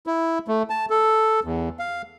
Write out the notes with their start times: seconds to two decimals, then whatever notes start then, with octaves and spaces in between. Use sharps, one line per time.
0.07 E4
0.48 A3
0.70 A5
0.90 A4
1.44 E2
1.79 F5